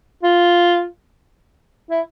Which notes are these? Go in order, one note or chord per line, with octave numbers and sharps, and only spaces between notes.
F4
E4